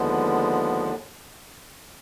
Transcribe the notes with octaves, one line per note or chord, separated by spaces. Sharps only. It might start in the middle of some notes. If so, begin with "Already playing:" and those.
Already playing: D#2 D3 F3 G#3 B3